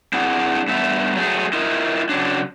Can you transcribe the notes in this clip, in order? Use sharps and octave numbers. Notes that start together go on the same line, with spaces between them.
C4 D4 E4 G#4 F#5
G2 A3 B3 E5
F#3 A3 G#4
E4 F4 A#4 D#5
C#3 F#3 D4